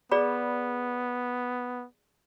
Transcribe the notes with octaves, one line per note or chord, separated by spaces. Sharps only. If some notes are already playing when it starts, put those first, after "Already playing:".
B3 G#4 D5 B5